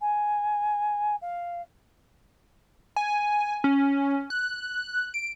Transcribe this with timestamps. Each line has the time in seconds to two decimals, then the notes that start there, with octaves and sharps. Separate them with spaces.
0.01 G#5
1.22 F5
2.96 G#5
3.64 C#4
4.30 F#6
5.14 D7